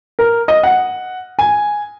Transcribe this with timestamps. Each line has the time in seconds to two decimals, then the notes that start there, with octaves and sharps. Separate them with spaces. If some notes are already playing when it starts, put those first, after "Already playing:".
0.19 A#4
0.48 D#5
0.63 F#5
1.39 G#5